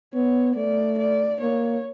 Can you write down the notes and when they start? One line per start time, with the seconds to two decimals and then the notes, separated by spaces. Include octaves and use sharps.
0.14 B3 C#5
0.56 A3 D5
0.98 D5
1.40 A#3 C#5